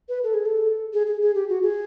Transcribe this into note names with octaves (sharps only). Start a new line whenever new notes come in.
B4
A4
G#4
A4
G#4
G#4
G#4
G4
F#4
G#4